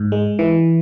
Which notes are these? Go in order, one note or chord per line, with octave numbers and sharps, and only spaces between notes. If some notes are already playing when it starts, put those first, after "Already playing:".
Already playing: G#2
G#3
E3